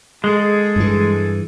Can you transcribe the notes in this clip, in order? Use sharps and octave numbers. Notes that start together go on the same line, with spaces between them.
G#3 G#4 A4
G2 E3